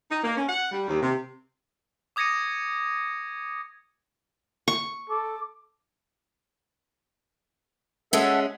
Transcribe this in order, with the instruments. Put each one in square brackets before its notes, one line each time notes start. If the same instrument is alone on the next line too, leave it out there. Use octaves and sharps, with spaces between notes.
[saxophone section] D#4
A#3
C#4
F#5
G3
D#2
C3
[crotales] D6 D#6 G#6 A#6 C#7 D#7
[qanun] C#6
[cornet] A4 [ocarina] D6
[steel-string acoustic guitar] G#3 C#4 [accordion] A4 E5 F#5